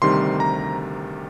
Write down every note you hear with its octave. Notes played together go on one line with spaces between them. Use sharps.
D2 C3 D#3 G3 C6
A#5